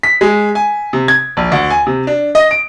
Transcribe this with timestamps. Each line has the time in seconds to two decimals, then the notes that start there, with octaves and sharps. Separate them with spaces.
0.03 B6
0.21 G#3
0.55 G#5
0.93 C3
1.08 G#6
1.37 A#1
1.52 D2
1.70 G#5
1.87 C3
2.07 D4
2.35 D#5
2.51 D7